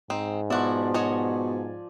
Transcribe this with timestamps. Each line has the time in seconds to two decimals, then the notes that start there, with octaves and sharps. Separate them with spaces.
0.10 G#2 C4 D#4
0.50 B2 F3 E4 F#4 D5
0.94 F#4 C#5 D#5 G#5